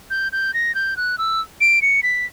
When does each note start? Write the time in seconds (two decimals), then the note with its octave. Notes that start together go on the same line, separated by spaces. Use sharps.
0.10 G6
0.32 G6
0.54 A#6
0.75 G6
0.97 F#6
1.18 E6
1.61 D7
1.82 C#7
2.03 B6